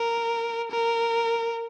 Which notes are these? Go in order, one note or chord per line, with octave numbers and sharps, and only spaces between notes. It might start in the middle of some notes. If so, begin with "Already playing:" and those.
Already playing: A#4
A#4